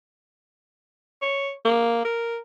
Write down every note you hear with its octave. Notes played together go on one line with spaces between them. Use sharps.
C#5
A#3
A#4